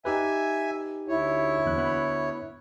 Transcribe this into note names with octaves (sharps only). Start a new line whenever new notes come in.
D#4 G4 B4 E5 G#5
D2 E4 C#5
E2 F#6
B3 B5 F#6